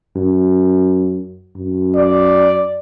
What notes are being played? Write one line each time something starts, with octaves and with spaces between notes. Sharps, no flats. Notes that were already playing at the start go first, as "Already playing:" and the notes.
F#2
F#2
D5